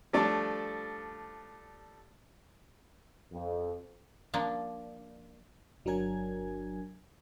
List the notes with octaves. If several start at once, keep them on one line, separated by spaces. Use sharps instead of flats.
F3 G3 A3 D4 A4 D5
F2
F3 A#3 D4
G1 F#3 D4 A#4 G#5 G#6